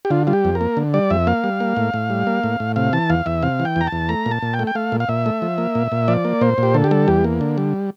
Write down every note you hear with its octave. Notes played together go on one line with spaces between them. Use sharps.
G4
D3 F4
G3 F4
G4
F2
A#4
A#3
D3
G3 D5
F2 E5
A#3 F5
G3
A#3
A2
A2
G3
A#3
A2
A2
C3 F5
E3 A5
E2 F5
E2 E5
C3 F5
E3
G5
E2 A#5
A5
E2
A3 A#5
A#2
A5
A#2
G5
A3
G5
A3 F5
A#2
F5
A#2 E5
A3
F3
A#3
A#2
A#2
F3 D5
A#3
A#2 C5
A#2 G4
D3 A4
G4
G3 A4
E2 G4
A#3
D3
G3